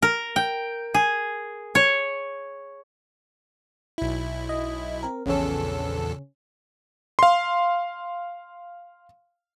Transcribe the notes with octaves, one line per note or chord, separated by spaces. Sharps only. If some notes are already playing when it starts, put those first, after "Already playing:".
A#4
G5
G#4
C#5
B1 E4
D#5
C4 A#4
A#1 E2 C#3 C#4 A4
F5 C6